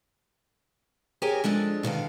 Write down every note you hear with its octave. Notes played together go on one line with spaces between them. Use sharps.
G4 G#4 A#4 C#5 G#5
F3 G#3 D4 A4
B2 D3 D#3 F5